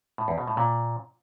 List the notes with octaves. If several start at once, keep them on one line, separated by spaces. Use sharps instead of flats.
A2
E2
B2
A2
A#2